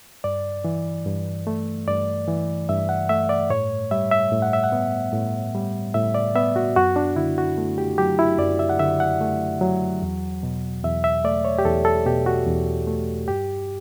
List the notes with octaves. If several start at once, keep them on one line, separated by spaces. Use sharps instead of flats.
G2 D5
E3
G2
A3
G2 D5
E3
G2 E5
F#5
A3 E5
D5
A2 C#5
G3 E5
E5
A2
F#5
E5
F#5
B3
A2
G3
A2 E5
D5
B3 E5
F#4
F#2 F#4
D4
D3 E4
F#4
A3
G4
F#3 G4
E4
F#2 D5
E5
F#5
D3 E5
F#5
A3
F#3
E2
B2
E2 E5
E5
A3 D5
C#5
G4
E2 A4
A4
B2 G4
F#4
E2
A3
G2 G4